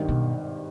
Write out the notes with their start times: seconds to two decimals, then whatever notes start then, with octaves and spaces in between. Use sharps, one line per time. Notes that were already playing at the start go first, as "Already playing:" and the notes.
Already playing: G#1 G2 D#3
0.08 B2